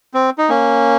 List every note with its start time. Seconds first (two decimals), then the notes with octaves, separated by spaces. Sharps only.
0.14 C4
0.38 D#4
0.49 A#3 C#4